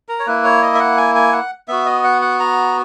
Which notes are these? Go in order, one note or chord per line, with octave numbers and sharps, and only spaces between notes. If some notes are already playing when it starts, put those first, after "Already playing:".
A#4
C#5
A#3 E4 B4
C#5
D#5
E5
F#5
G#5
G#5
F#5
B3 F#4 E5
D#5
F#5
F#5
A#5